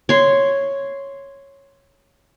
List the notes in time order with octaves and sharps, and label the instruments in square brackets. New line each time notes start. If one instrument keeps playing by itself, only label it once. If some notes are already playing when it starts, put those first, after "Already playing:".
[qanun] C#5 C6